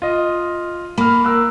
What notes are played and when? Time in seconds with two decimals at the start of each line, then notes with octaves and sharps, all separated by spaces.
0.02 F4 D#5
0.98 A#3 B5 F6
1.24 A#4 E6 F#6